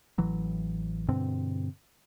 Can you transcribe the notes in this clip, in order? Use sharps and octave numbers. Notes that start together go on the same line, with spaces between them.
A1 E3 F#3
G2 B2 D3 C4